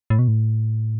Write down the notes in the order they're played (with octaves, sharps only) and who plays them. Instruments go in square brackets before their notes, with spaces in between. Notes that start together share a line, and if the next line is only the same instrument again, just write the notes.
[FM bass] A2
B2
A2